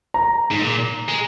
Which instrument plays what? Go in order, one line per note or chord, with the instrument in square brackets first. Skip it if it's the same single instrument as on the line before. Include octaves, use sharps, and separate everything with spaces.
[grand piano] A#5
[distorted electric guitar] G#2
A#2
G#3